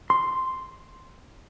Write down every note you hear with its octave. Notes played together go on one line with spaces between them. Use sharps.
C6